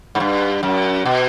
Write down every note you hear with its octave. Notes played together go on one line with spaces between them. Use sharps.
G#2
G2
F#2
B2